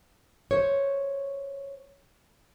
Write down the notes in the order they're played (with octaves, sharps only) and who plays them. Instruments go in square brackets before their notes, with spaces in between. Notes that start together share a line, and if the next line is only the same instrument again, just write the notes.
[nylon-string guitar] C5 C#5